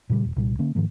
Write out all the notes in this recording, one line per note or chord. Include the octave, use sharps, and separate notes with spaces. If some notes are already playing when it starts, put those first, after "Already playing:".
A#2 C#3 F#3 G3
E1
C2 A#2 G3
D3 A#3 C#4
G#2 D#3 F3 A#3